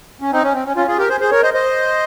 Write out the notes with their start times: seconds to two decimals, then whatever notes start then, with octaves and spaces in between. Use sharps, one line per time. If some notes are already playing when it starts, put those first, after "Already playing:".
0.21 C#4
0.32 C4 D#4
0.43 C#4
0.54 C4
0.66 C#4
0.76 C#4 F4
0.88 F4 G#4
0.98 G4 A#4
1.09 G#4 C5
1.20 G#4 C5
1.31 A#4 C#5
1.43 C5 D#5
1.54 C5 D#5